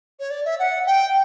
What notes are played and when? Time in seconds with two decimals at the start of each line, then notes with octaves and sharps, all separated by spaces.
0.20 C#5
0.30 D5
0.45 E5
0.59 F#5
0.86 G5